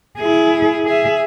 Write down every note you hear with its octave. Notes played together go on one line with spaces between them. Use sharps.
E4 G#4
G#4 E5